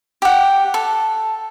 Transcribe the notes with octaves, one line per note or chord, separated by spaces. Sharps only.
G4 F#5
A4